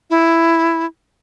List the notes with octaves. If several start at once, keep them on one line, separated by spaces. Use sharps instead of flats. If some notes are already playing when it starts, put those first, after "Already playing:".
E4